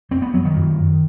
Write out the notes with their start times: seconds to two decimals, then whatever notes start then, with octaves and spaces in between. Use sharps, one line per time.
0.11 F#2 C4
0.22 B3
0.34 F#3
0.45 D#3
0.56 F#2